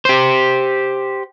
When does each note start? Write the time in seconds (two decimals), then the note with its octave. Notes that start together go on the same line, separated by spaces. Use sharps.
0.05 G4 C5